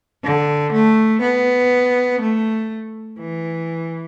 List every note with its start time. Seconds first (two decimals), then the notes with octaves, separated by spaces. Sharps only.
0.24 D3
0.73 A3
1.22 B3
2.21 A3
3.19 E3